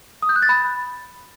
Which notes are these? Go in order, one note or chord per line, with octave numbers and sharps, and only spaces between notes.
D#6
G6
F#6
A6
B5